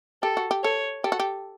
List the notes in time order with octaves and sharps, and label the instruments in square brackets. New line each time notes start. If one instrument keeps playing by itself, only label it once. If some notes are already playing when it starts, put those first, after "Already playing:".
[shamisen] G4 [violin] A4
[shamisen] F#4
G4
[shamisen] A4 [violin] C#5
[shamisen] G4 [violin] A4
[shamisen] F#4
G4